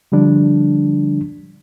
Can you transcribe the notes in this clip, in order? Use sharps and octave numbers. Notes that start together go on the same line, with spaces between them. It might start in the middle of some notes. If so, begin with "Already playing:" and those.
D3 F3 G3 D4